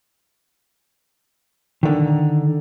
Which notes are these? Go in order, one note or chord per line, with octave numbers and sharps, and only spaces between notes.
D3 D#3